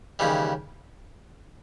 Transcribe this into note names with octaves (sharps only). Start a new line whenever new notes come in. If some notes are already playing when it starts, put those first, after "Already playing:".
D#2 C#3 E3 G3